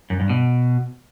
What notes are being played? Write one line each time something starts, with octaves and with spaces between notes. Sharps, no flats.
F#2
G2
B2